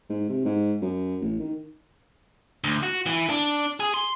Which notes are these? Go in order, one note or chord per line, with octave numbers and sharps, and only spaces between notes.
G#2
C3
G#2
F#2
A1
D#3
D2
F#4
E3
D4
G#4
C6